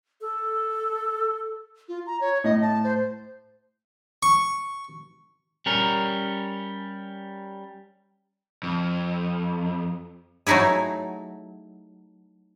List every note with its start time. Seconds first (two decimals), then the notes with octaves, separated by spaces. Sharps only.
0.21 A4
1.89 F4
2.07 A#5
2.21 C#5
2.44 A2 D#5
2.62 A5
2.84 C5
4.23 C#6
5.66 G3 C#4 A#4
8.63 F2
10.47 F#3 A3 D#4 E4 G#4